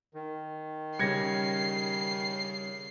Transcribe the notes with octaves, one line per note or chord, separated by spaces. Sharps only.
D#3
C#3 G3 G#6 A#6 C7 C#7